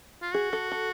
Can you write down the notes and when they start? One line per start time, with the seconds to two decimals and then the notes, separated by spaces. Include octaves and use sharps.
0.22 F4
0.33 F#4 G#4
0.53 A4
0.72 A4